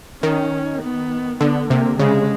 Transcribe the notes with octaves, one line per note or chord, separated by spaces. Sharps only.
D#3 C#4
B3
D3 B3
C3 A#3
C#3 G#3